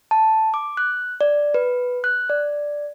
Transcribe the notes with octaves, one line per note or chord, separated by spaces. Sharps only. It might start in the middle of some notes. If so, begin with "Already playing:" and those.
A5
D6
F#6
D5
B4
F#6
D5